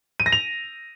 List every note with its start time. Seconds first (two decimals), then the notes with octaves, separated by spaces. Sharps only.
0.20 D#7
0.26 A#6
0.32 F7